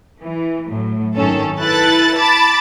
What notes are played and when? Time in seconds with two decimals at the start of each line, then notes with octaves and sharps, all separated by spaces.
0.20 E3
0.68 A2 F#3
1.15 G#1 F#2 D#3 C#4 A4
1.58 E4 A4 B4 F#6 A6
2.17 A5 B5 D6 A6